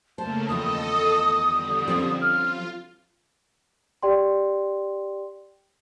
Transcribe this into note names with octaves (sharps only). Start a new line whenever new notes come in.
C#3 A3 A#3 C5 A5
E2 D#3 F3 A4 D#5 D#6
D3 G3
F3 C4 C#4
F4 F6
G4 D5 G5 C6